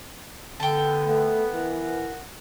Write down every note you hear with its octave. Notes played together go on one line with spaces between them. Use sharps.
D3 B3 G5 A5
A3
E3 A#4 F#5